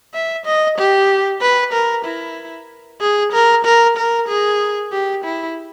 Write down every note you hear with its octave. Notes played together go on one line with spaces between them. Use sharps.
E5
D#5
G4
B4
A#4
E4
G#4
A#4
A#4
A#4
G#4
G4
E4